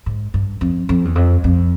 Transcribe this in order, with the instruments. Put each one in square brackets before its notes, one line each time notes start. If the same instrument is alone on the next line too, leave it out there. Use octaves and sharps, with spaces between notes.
[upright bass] G#2
G2
F2
F2
E2
F2
F2